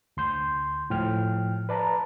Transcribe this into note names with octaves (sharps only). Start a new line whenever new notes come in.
D2 C6 G6
A2 F3 G5 F6
B4 D5 A5 A#5